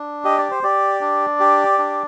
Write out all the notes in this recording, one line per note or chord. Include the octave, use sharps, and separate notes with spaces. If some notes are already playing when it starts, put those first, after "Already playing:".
Already playing: D4
G4 D#5
D5
C5
G4 D5
D4
G4
D4